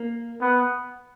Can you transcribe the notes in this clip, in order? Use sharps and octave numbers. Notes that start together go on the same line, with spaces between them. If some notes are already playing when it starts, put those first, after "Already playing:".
Already playing: A#3
B3